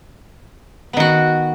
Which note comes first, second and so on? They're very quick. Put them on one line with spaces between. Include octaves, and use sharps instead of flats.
B3 D#3 F#4